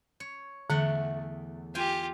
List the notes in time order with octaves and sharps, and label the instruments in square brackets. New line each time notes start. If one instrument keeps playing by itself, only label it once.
[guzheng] C#5
[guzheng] E2 A3 F#5 [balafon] D3
[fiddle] F4 G4 [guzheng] G5 G#5